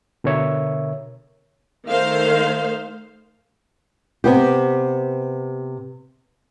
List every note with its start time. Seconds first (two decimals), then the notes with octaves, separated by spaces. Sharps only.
0.24 B2 D3 A#4 C#5 E5
1.87 D#3 A3 C5 F5
4.24 C3 B3 G4